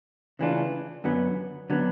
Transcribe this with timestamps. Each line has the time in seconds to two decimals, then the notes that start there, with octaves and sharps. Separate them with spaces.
0.39 C#3 E3 A3 D4 F4
1.04 F#2 D3 F#3 B3
1.70 D3 F#3 B3